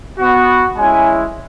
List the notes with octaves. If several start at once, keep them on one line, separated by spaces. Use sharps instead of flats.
B3 F#4
G#3 C#4 E4 G#5